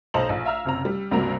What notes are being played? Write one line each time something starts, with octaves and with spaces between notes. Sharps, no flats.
B1 C5 D#5 A5 A#5 F#7
A#1
E5 F5 A#5 E6 F6
F#1 C3 A#5
G3
C#2 G2 C3 A#3 F#4 A#5